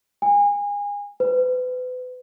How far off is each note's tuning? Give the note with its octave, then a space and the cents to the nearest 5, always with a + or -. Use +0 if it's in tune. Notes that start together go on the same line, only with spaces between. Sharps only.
G#5 -30
B4 +35